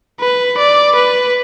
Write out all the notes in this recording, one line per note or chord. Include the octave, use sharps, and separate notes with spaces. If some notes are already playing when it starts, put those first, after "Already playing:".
B4
D5
B4